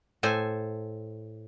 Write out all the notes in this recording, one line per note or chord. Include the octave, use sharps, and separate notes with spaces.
A2 A4 C5 G#5